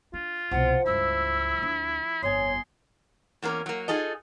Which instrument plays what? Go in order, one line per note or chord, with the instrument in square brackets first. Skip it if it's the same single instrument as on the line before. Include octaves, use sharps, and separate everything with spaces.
[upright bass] D4 [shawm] F4
[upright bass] C2 B2 [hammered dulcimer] F3 [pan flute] F#5
[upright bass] C#2 G2 [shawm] E4 [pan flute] E6
[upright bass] D2 D4
[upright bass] G1 F2 [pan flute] C#5 [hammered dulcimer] D#5 G#5 [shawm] C6
[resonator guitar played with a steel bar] E2 A#3 C#4 A#4
F#3 A#3
D#4 F4 G#4 A4 D#5